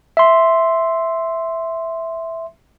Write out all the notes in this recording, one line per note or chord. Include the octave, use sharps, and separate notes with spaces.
E5 C6